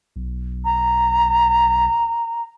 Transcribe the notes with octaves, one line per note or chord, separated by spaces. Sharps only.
B1
A#5